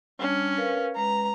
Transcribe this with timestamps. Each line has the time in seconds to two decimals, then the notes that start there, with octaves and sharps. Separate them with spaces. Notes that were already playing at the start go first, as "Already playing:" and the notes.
0.20 G3 C#4 D4 A5
0.57 A#4 B4 F5
0.96 G#3 B4 A#5